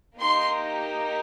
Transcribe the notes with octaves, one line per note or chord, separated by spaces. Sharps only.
A#3 D#4 G4 C6